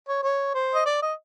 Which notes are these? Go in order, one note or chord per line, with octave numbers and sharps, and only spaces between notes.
C#5
C#5
C5
D#5
D5
D#5